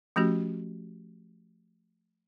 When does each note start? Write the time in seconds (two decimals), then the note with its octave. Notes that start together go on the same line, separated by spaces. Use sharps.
0.16 F3 A3 C#4 F#4 G4